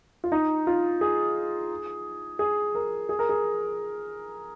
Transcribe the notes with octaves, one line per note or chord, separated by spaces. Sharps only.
F4
D#4
F4
G#4
G#4
A#4
G#4
A#4
G#4